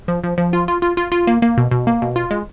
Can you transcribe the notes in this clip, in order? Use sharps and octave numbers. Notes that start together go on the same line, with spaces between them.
F3
F3
F3
F4
F4
F4
F4
F4
A#3
A#3
B2
B2
A#3
B2
F4
G#3